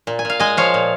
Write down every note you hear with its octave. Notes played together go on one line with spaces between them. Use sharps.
A#2
G#5
A#2 F5
G#3 D#5 G#5
F3 C#5 F5
A#2